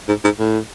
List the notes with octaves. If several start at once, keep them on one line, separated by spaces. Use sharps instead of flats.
G#2
G#2
A2